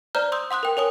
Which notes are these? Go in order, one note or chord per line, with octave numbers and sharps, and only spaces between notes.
C5 D5 A#5 F6 G6
C6 D#6 E6 G6
F#5 C6 D#6 F#6
A#4 G5
A#4 C#5 G#5 D#6